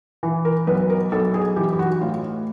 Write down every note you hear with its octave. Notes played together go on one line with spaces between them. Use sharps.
E3
A#4
B1 B4
A#4
B1 A4
G#4
E3 G4
G4
F#4
A2 F4